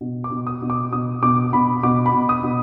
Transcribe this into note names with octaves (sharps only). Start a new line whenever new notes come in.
B2
D6
B2
D#6
B2
D6
B2 D#6
B2 D6
B2 B5
B2 D6
B5
B2
D#6
B2